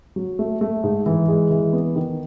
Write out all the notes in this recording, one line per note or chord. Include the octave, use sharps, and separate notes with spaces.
F#3
A3
A3
G#2
E3
G#3
E3
B3
D#3